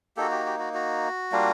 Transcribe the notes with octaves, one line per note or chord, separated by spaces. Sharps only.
A#3 D#4 F#4 G4 A4
G4
G4
F#4
F#4
G3 A#3 D4 F4